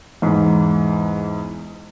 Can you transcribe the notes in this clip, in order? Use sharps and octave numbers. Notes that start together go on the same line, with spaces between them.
E2 G#2